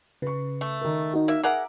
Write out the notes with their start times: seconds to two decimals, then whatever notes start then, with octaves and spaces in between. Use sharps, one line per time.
0.22 C#3 B4 C#6
0.61 A3
0.81 D#3 A#4
1.14 D#4 F#4
1.28 A#3 E5
1.43 G#4 A#4 E5 F#5 A#5 D6